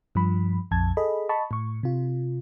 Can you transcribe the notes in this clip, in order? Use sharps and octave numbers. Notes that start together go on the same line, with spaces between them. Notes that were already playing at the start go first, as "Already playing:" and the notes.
G2 F3 B5
A#1 F2 A5 G#6
G#4 A4 D#5 B5
D#5 A5 B5 C#6
A2 C#6
C3 F4